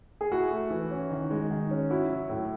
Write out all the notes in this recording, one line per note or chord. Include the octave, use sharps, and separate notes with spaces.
G#4
E4 F#4
A3
E3
C#4
D#3
G#3
D#3
C#4
E4 F#4
F#3
A2